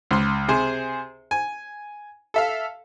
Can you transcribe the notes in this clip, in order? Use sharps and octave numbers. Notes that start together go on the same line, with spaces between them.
C#2 C6
C3 G#4 C5
G#5
A4 E5 F5